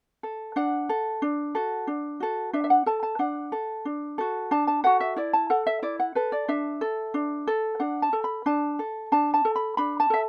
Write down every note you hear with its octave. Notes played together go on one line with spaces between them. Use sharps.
A4
D4 F#5
A4
D4
F#4 A4
D4
F#4 A4
D4 E5
E5
F#5
A4 A5
A5
D4 F#5
A4
D4
F#4 A4
D4 A5
A5
F#4 A4 F#5
E5
E4 D5
A5
A4 F#5
E5
E4 D5
F#5
A4 B4
D5
D4 E5
A4
D4
A4
D4 F#5
A5
A4
B5
D4 A5
A4
D4 A5
A5
A4
B5
D4 B5
A5
A4 E5